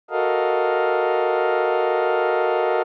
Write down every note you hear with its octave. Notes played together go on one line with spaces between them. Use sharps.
F#4 A4 A#4 D#5 F5